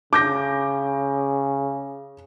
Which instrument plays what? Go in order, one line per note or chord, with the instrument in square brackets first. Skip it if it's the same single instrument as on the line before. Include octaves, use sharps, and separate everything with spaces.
[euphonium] C#3 [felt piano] D6 G6 A#6